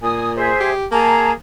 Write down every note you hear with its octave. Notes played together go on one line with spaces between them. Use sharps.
A#2 G#5 D#6
G#4 C5 E5
G4
A#3 G#4 A5 A#5